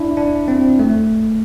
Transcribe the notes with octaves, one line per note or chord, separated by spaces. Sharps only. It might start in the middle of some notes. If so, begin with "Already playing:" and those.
Already playing: D4 E4
D4
C4
A3